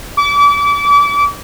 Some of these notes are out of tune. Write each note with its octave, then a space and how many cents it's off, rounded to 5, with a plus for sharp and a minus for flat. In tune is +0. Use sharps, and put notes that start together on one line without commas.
D6 -35